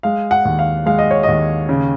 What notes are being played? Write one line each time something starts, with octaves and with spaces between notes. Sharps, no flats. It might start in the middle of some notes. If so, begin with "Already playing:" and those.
G#3 F5
F#5
D#2
F5
G#3 F5
D#5
C#5
D#2 D#5
C#3